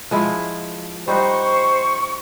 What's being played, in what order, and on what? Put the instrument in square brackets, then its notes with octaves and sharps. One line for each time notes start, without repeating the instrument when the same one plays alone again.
[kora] F3 G#3 E4
[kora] G3 D#4 F#4 [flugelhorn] C5 [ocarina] C#6